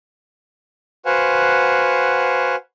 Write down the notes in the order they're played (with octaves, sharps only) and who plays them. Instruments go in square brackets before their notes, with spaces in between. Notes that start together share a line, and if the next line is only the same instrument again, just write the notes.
[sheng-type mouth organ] F#4 B4 C5 F5 F#5 G#5